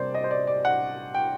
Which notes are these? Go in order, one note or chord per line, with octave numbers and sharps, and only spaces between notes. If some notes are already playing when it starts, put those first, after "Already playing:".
Already playing: C3 G3 A#3 D4 C5 D5
D#5
C5
D5
D5
F#5
G5